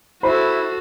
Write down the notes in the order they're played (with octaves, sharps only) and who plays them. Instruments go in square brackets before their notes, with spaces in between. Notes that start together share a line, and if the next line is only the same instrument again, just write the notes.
[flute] E4 [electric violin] F#4 A4 [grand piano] C5 B5